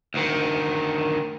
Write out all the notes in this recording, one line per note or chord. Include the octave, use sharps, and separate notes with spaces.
D2 D#3